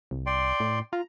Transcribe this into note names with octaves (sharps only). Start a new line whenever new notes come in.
C2
D5 G5 C6
A2
F4 A#5